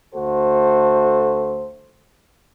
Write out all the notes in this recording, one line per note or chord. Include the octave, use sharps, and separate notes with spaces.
D2 A3 F#4 A4 C5